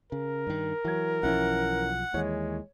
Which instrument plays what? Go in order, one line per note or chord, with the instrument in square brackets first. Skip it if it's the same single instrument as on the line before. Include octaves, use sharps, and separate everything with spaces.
[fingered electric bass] C#3 [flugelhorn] A#4
[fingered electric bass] G2 D#3
[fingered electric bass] E3 [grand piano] F#3 G#6
[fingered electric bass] B1 F3 [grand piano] E3 C#4 E4 [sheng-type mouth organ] F#5
[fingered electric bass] D#2 E3 [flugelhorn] G#3 [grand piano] C#5